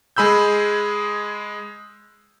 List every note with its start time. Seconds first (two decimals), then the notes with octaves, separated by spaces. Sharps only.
0.17 G#3 G#4 B5 E6 G6